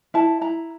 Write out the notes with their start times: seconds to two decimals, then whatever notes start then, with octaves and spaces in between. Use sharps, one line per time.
0.14 E4 A5
0.41 E4 A#5